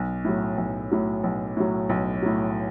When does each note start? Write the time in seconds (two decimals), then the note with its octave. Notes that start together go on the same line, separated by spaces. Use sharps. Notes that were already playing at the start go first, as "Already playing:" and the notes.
Already playing: B1
0.25 A2 F#3
0.57 B1
0.91 A2 F#3
1.23 B1
1.57 A2 F#3
1.89 B1
2.22 A2 F#3